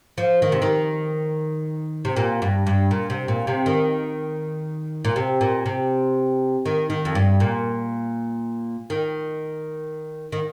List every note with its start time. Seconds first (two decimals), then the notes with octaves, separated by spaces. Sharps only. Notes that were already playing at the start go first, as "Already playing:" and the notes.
0.18 F3
0.42 D#3
0.52 C3
0.62 D#3
2.05 C3
2.16 A#2
2.42 G2
2.67 G2
2.91 A#2
3.10 C3
3.28 A#2
3.47 C3
3.66 D#3
5.05 A#2
5.16 C3
5.41 A#2
5.66 C3
6.65 D#3
6.90 D#3
7.05 F2
7.15 G2
7.40 A#2
8.90 D#3
10.32 D#3